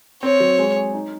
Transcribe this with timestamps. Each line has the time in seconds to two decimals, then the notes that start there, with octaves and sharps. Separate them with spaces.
0.23 C4 C#5
0.40 F#3
0.58 G#3
0.76 G#4
0.94 D#4